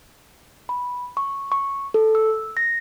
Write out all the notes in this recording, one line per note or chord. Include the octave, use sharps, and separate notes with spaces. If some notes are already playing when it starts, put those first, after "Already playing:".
B5
C#6
C#6
A4
E6
A#6